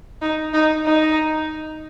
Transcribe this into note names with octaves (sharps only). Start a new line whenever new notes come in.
D#4
D#4
D#4